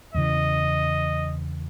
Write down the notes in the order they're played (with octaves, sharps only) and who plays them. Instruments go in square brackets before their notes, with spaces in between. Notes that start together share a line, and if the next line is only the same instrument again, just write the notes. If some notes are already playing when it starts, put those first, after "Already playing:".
[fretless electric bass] E2 C#3 E3 [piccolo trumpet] D#5